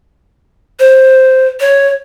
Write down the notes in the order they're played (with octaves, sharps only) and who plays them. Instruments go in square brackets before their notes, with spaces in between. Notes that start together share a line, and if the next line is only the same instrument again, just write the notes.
[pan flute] C5
C#5